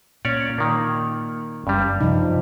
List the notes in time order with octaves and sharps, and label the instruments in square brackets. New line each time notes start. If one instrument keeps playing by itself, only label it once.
[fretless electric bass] A#2 [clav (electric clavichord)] C#4 C#5 D5
[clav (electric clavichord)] D#3 A#3
[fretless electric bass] F#1 C#4 [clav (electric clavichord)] G2 G3
[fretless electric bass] F#2 C3 [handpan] F3 D#4